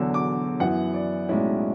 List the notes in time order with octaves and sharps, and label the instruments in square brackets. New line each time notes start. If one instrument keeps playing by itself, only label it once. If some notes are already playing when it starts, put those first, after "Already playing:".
Already playing: [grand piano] E1 E2 D3 F#3 E6
D6
F#2 E3 B3 E4 F#5
D5
B1 A2 G#3 C#4 E4 D5